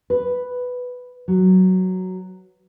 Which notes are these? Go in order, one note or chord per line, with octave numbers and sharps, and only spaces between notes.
B4
F#3